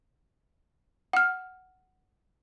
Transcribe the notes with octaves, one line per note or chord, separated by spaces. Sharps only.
F#5 F6